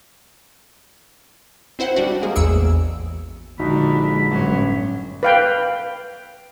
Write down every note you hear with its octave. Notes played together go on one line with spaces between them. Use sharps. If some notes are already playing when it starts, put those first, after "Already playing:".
C4 E4 C5 F#5
G3 D4 F#4
G#3 A#3 G#4
A1 E2 G#4 E6 C#7 D7
A#1 D3 G#3 D#4 F#4 B5
G1 F#2 A2 F#3
B4 F5 G5